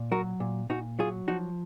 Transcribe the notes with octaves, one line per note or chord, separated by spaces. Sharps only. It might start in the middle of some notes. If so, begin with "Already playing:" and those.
Already playing: A#2
F#3 F#4 A#4
A#2
A#2 D#4 F#4
F#3 F4 G#4
F3 D#4 F#4